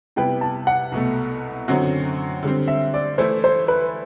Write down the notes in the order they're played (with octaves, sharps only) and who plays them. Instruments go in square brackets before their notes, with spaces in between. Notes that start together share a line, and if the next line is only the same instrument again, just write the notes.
[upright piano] C3 G3 B3 E4 B4 [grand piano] G5
[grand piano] A5
F#5
[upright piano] C2 B2 A3
F#2 D3 F#3 C4 F#4
D3 G3 C4
[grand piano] E5
D5
[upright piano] E3 A3 E4 [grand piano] C5
[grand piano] C5
B4